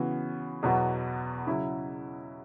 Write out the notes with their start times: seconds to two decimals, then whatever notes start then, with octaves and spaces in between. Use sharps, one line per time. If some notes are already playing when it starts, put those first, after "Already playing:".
Already playing: C#3 E3 B3 F#4
0.63 E2 B2 F#3 B3 F#4
1.47 C#3 F#3 E4